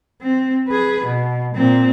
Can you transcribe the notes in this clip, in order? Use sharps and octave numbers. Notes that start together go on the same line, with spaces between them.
C4
G#4 B4
B2
A#2 C4